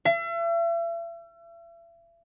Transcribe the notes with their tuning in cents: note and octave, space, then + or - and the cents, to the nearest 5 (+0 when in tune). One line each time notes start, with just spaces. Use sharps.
E5 +40